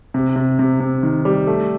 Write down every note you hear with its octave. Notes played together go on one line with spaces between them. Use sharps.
C3
C3
C3
C3
D#3
G3
A3